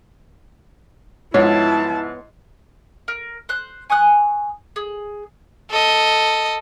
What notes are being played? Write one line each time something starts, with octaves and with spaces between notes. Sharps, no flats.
G#2 F3 B3 E4 C#5 A5
A#4
C5 F#6
G#5 C#6 D#6 F#6
G#4
A4 D#5